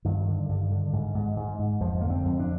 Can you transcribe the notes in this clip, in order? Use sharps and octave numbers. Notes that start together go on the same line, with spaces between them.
G2 D#3
D3
G2
D3
G#2
G#2
G#2
G#2
F2 F3
D3 A#3
C4
F2
D4